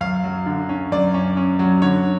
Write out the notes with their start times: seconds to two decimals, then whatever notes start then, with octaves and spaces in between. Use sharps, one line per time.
0.01 F#2 F5
0.24 F#3
0.46 D3
0.69 C#4
0.92 F#2 D5
1.14 C#4
1.37 C#4
1.59 F#3
1.82 D3 C#5